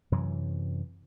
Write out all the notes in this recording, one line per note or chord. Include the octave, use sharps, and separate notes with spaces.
F#2 C3 E3 F#3